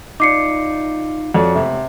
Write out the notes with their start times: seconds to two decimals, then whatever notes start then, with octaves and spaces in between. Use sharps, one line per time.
0.20 D#4 F4 D5 D6 C7 C#7
1.34 F2 F#4 C#5 D5
1.55 C#2 C3 A3 B3